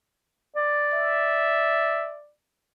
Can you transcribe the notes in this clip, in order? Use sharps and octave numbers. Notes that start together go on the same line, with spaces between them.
D5
E5